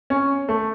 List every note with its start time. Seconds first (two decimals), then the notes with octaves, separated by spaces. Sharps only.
0.10 C#4
0.49 A3